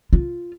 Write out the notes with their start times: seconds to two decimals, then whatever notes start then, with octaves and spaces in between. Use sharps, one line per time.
0.13 F4